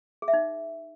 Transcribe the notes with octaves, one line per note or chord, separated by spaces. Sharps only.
G#4
E5
D#4